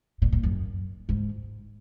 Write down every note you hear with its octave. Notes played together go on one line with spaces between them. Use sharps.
A#2
A#2
F#2
G#2